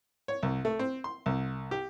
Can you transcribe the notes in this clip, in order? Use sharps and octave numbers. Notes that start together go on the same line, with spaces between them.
C#5
C2
A3
C4
C6
C2
G4